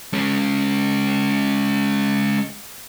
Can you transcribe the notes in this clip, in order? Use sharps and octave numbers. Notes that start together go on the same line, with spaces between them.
G#3 C#4